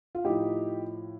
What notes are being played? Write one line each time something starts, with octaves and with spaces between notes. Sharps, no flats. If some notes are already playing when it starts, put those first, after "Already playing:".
F4
A2 F3 D#4 G4